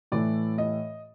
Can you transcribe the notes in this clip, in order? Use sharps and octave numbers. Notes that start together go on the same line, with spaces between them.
A2 E3 A3 D5
D#5